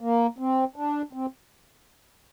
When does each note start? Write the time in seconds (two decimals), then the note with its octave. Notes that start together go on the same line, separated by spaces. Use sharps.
0.01 A#3
0.38 C4
0.76 D4
1.13 C4